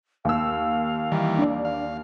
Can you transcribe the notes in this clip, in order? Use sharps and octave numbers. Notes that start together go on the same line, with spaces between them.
D#2 F5 E6
D#3 E3 G3
D4 D5
F5